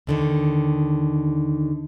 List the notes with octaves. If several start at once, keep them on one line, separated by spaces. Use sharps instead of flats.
D#2 D3 D#3